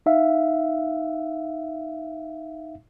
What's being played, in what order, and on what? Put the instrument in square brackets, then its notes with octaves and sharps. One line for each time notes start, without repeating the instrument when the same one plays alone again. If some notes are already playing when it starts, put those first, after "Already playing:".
[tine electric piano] D#4 E5 F5